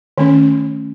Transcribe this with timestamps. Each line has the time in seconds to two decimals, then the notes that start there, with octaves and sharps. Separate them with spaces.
0.18 D#3 A3 C#4